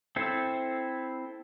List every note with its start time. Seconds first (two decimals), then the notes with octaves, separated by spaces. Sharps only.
0.16 C4 E4 A4 C5